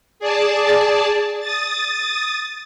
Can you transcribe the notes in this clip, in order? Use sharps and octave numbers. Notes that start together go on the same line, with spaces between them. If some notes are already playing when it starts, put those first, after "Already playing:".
G#4 D5 A5
D#6 A6